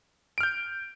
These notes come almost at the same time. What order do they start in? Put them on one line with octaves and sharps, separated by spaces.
D7 F6 G6